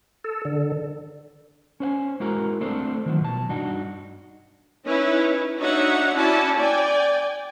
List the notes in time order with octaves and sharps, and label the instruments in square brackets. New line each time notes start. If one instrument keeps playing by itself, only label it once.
[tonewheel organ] A4
D3
[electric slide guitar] C#4 C5 F#5 G#5
G#3 E4 F#4 A#4 A#5
A3 C4 D4 A4 C5
D#3 F3 F#3
B2 A5
G2 D4 D#4 F#4
[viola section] C#4 D#4 E4 B4 C#5
D4 D#4 F#4 C#5 E5 F#5
C#4 E4 F#4 D5 A5
D5 G5 G#5